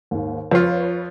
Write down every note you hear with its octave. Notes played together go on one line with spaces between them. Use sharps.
D#2 G#2
F2 F3 F4 B4 C#5